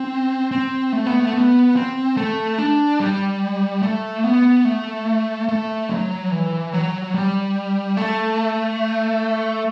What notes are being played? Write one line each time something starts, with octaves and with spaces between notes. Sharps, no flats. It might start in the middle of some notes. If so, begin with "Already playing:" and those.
Already playing: C4
C4
A3
B3
A3
B3
C4
A3
D4
G3
A3
B3
A3
A3
F#3
E3
F#3
G3
A3